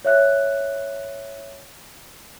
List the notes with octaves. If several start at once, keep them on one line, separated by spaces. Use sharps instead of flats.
C#5 E5 F#6